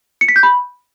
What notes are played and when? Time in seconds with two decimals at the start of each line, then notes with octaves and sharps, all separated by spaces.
0.21 C#7
0.28 B6
0.36 G6
0.43 B5